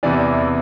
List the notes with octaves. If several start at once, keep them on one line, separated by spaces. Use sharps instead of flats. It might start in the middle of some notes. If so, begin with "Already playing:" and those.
E2 C3 E3 D5